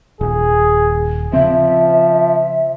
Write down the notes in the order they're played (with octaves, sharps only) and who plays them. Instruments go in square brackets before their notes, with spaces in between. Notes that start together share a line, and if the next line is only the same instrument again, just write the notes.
[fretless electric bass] D#1 [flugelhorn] G#4
[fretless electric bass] C#3 C4 [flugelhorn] F3 [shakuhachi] E5